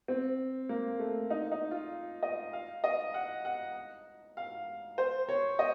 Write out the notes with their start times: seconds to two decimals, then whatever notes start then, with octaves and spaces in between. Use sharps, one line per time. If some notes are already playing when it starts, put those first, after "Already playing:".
0.08 C4
0.69 A#3
0.99 A3
1.30 D#4
1.52 D#4
1.71 F4
2.23 D#5
2.53 F5
2.84 D#5
3.14 F#5
3.45 F#5
4.37 F5
4.98 C5
5.29 C#5
5.59 D#5